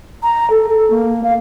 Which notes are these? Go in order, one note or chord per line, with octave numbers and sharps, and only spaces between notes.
A#5
A4
A4
A#3
F5